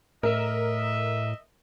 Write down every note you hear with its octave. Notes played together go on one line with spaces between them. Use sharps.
A2 A#4 D#5 E5